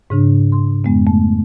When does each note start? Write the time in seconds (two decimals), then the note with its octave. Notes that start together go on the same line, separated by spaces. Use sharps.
0.10 G#2 C#3 D4
0.52 C6
0.84 F2 G#3 B3
1.07 A3